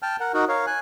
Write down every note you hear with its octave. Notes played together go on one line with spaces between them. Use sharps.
G5 A5 F6
A#4 F#5
D#4 F#4 A#4
A#4 C#5 F5
G#5 F#6